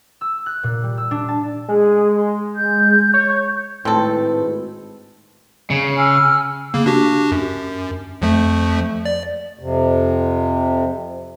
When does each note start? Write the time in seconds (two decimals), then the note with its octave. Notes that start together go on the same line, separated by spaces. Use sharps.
0.21 E6
0.46 F#6
0.63 A#2
0.83 G3
0.98 E6
1.11 D4
1.28 A5
1.69 G#3 G#4
2.16 C6
2.55 G6
3.14 C#5
3.85 G#1 A2 G#3 C4 A4 B4
5.70 C#3
5.96 G#5 E6 F6
6.74 C#3 A#3
6.86 D4 F#4 G4
7.32 F#2
8.22 F2 F3 A3
9.05 D5
9.59 F2 C3